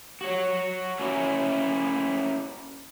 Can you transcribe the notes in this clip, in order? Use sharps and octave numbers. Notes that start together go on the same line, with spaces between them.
F#4 C#5
A#3 C#4 E4